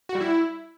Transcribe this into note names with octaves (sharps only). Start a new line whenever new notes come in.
F#4
G3
E4